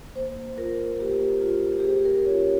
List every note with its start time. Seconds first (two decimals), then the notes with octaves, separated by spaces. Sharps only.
0.15 A#3 C5
0.57 F4 A#4
0.99 A#3 G4
1.42 F4
1.80 G4
1.84 A#3 G#4
2.05 A#4
2.26 C#4 F4 C#5